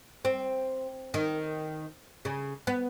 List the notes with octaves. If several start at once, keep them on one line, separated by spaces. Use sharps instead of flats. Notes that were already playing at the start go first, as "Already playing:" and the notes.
C4
D#3
C#3
B3